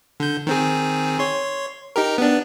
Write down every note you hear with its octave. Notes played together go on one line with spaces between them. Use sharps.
D3 G6
D#3 C4 G#4
C#5 C6
D#4 G4 A#4
B3 D4